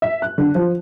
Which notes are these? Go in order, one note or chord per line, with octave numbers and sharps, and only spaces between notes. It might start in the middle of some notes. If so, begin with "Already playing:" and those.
E5
F#6
D3
F3